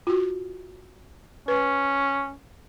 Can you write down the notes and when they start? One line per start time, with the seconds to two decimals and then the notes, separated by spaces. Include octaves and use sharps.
0.07 F4 F#4
1.48 C#4 B4